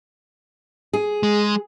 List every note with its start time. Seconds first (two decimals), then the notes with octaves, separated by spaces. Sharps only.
0.93 G#4
1.23 G#3